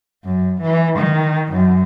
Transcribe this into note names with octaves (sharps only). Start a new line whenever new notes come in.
F#2
E3
D#3
F#2